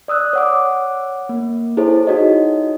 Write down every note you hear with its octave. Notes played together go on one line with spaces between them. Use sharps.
D5 D#6 E6 F#6
C#5 F#5 D6
A#3
E4 G#4 A4 C5 C#5
D#4 F#4 C#5 D#5